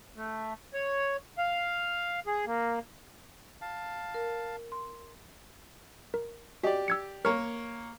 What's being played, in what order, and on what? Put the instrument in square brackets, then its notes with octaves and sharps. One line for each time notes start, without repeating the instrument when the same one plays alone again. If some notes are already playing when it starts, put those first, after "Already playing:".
[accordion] A3
C#5
F5
G#4
A#3
[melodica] F5 A5
[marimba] A#4
C6
[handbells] A#4
[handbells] F#4 D#5 [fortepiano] G4 D5
[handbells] E6 G#6 C#7
[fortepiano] A#3 C#5 [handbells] A#4 F6